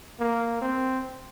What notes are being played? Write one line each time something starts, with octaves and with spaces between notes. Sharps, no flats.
A#3
C4